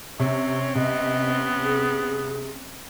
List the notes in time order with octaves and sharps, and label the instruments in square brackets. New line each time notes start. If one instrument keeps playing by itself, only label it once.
[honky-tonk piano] C3 [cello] C4 C#4 [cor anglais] C#5
[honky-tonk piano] C3 [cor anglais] B3 [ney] D#5
[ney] G#4